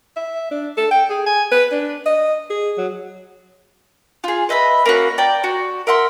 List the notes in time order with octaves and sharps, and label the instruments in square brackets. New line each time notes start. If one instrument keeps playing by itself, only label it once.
[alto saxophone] E5
D4
A4
G5
G#4
G#5
B4
D4
D#5
G#4
F#3
[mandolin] F4 G#4
B4 D#5 E5 B5
A#3 C#4 F#4
D5 G5 A#5
F#4
A#4 E5 F#5 C6